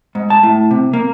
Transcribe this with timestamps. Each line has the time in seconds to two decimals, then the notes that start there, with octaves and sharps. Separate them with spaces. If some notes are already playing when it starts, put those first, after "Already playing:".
0.15 G#2
0.30 A5
0.43 A2
0.71 C3
0.93 A#3